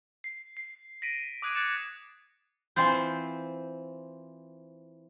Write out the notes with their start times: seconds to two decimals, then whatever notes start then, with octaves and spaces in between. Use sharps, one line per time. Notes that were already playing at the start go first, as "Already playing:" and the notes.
0.24 C7
0.57 C7
1.02 A#6 B6 D7 D#7
1.42 D6 D#6 F#6 G#6 D7 D#7
1.55 D#6 F#6 G#6 A6 C#7 E7
2.76 E3 C4 F4 C5